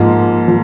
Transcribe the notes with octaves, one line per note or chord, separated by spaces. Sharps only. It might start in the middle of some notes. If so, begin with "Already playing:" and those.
Already playing: G#2 F3 A#3
F3